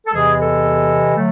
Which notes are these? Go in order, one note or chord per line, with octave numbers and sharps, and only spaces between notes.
A4
E2 C3 E3 G#3 G#4
A4
D3 F#3 A3